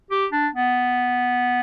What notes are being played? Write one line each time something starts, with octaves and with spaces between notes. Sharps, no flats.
G4
D4
B3